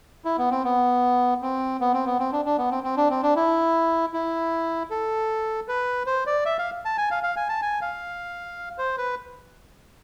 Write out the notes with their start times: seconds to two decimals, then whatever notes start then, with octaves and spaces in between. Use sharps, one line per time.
0.25 E4
0.38 B3
0.51 C4
0.64 B3
1.42 C4
1.81 B3
1.93 C4
2.06 B3
2.19 C4
2.32 D4
2.45 D4
2.58 B3
2.71 C4
2.84 C4
2.97 D4
3.10 C4
3.22 D4
3.36 E4
4.13 E4
4.91 A4
5.68 B4
6.06 C5
6.26 D5
6.46 E5
6.59 F5
6.85 A5
6.98 G#5
7.11 F5
7.23 F5
7.36 G#5
7.49 A5
7.62 G#5
7.82 F5
8.78 C5
8.98 B4